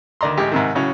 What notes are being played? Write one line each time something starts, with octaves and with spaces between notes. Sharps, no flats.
D2 D#3 D5 A#5 C6
A1 G#3 G4
G#2 C3 D#3
A2 C#3 F#3 C#4